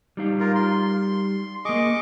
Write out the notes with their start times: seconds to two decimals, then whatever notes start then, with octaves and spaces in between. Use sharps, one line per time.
0.17 G3 D#4 F5
0.40 F4 A#4
0.55 C6
1.65 A#3 G#4 D#5 C#6 D6